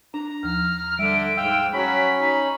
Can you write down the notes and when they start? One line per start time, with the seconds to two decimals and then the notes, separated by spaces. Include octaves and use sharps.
0.14 D4 A#5
0.43 D#2 F3 F6
0.99 D3 G3 E5 D7
1.37 G#2 F5 G5 E6
1.73 F#3 C#4 B5 B6
2.20 D#4